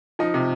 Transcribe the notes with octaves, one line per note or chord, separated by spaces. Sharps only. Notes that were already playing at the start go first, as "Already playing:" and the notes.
F3 D#4
C3